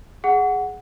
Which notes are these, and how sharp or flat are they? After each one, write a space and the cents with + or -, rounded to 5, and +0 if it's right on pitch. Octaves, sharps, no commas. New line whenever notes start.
G#4 +0 F#5 +0